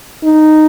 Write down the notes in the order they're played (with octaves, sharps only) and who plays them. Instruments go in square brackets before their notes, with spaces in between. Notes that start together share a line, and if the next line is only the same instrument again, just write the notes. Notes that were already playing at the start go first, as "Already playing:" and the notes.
[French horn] D#4